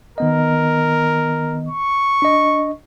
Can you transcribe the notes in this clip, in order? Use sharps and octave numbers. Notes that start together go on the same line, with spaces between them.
D#3 B3 A#4 D#5
C#6
D4 D#5